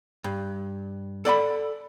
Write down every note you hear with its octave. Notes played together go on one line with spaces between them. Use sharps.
G2
A4 D5 F#5 B5